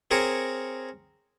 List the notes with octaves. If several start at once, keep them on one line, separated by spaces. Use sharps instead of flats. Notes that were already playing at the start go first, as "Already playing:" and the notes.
C4 G#4 A#4 C#5